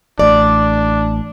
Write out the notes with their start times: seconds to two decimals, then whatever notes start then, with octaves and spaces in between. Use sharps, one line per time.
0.19 A1 A3 D4 D5